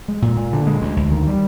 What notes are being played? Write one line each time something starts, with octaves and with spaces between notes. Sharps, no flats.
G#3
A#2
A#2
D3
G#3
D2
D2
D#3
G3